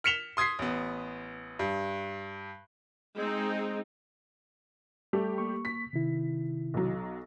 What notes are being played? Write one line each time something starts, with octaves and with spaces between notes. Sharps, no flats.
F6 B6 C#7 E7 F7 G7
C6 D#6 G#6 B6 C7
A1 B3
G2
G#3 C4 D#4
G3 A3 G4
A#3 C#6
B6
C3 D#3 E4
B1 F#3